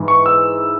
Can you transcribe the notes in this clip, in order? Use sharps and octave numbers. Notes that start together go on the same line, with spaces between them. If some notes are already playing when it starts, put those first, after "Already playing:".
Already playing: G#2 E3
C#6
E6